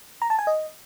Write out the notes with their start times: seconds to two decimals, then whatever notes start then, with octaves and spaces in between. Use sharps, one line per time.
0.22 A#5
0.30 A5
0.39 G#5
0.47 D#5